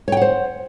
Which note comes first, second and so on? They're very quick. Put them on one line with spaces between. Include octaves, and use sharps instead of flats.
C#5 G5 F#5 C5